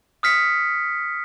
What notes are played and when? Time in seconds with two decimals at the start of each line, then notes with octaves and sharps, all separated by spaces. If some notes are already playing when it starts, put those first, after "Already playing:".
0.23 D#6 F6 B6 C#7